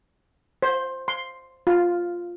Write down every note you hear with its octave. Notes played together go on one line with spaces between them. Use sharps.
C5
C6
F4